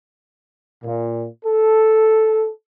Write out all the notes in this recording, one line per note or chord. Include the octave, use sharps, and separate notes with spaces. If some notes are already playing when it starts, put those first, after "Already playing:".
A#2
A4